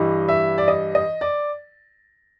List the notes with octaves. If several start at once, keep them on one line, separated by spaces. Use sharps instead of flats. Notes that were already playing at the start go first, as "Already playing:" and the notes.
Already playing: G2 E3 G3 D#5
E5
D5
D#5
D#5
D5